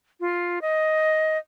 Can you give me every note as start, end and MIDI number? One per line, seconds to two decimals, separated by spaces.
0.20 0.59 65
0.62 1.38 75